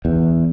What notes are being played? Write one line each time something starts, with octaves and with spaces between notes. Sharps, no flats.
E2